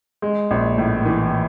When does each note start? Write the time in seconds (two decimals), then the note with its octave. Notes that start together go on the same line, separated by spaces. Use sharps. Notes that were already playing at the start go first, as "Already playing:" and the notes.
0.22 G#3
0.51 A#1
0.78 A2
1.06 E3